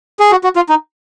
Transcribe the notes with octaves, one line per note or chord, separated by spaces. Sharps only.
G#4
F#4
F#4
F4
D#4